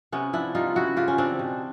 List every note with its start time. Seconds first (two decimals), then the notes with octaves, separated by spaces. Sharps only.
0.12 C3 B3 C#4
0.33 F3 D4 E4
0.55 G3 D#4 F4
0.75 C#3 E4 F#4
0.97 C#3 F4 G4
1.08 C#4
1.18 E3 C4 D4
1.39 B2